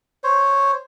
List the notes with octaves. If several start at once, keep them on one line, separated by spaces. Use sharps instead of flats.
C5 C#5